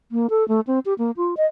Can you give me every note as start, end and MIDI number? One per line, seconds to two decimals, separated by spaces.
0.12 0.30 58
0.30 0.46 69
0.48 0.60 57
0.67 0.79 60
0.85 0.94 67
0.98 1.11 58
1.17 1.34 65
1.37 1.46 75